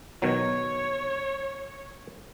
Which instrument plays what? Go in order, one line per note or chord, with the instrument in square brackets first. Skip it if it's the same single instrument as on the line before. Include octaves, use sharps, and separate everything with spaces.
[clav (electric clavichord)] B2 D#3 F#3 [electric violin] C#5